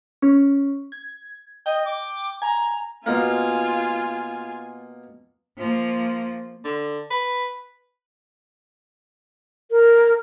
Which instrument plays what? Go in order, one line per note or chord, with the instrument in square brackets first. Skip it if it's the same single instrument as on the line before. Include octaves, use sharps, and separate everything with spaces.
[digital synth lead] C#4
G#6
[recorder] D#5 [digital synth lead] G5
[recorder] D6
[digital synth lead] G#5 [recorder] A#5
[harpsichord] B2 A#3 [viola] F4 G#5
[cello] F3 A#3
[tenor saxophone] D3
B4
[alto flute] A#4